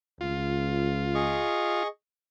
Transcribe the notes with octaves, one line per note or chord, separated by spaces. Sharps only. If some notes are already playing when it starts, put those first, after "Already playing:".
C#2 F4
G#4 D#5 C#6